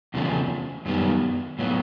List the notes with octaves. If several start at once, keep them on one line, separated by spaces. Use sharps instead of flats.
E2 C#3 F3 A3 C4
F#2 D#3 G3 B3
A2 F#3 B3